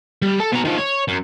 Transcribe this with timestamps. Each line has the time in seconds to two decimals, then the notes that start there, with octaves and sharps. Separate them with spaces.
0.22 G3
0.40 A4
0.53 B2 A#5
0.65 D#3 F3
0.78 C#5
1.08 F#2